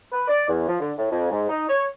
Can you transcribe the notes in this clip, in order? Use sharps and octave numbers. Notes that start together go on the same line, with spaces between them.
B4
D5
E2
F3
D3
A2
F2
G#2
D#4
C#5